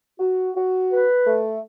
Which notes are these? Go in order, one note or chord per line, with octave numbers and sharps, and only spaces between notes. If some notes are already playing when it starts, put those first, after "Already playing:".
F#4
F#4
B4
A3